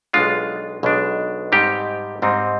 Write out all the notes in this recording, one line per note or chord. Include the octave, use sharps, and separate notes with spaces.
B1 B2 G#3 D4 F4
B1 B2 G#3 D4
G#2 G3 C4 D#4 G4
G#2 G3 C4 D#4